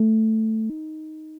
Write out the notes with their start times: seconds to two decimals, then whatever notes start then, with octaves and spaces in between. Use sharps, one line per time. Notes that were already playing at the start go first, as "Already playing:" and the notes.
Already playing: A3
0.69 D#4